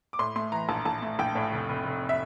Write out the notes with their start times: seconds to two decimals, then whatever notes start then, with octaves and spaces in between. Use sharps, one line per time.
0.13 D6
0.19 A2 C6
0.36 A3 C6
0.52 E3 A#5
0.69 A#1 A5
0.85 A#1 A5
1.02 A3
1.19 A#1 G5
1.35 A2
1.52 F1
1.69 F1
1.85 F1
2.09 E5